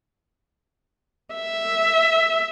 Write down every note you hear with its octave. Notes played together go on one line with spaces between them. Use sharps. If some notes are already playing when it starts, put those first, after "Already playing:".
E5